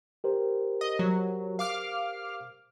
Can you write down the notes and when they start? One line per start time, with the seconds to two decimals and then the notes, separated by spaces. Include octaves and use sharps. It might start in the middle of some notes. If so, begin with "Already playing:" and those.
0.24 G4 A#4 C5
0.81 D#5
0.99 F#3
1.59 F5 D6 F6